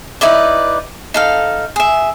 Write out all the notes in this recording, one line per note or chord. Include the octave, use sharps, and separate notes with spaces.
D#4 E4 B4 D5
D#4 A4 F5
G#4 E5